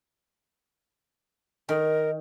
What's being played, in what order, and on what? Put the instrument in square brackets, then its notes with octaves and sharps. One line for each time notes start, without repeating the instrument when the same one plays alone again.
[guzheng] D#3 [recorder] A#4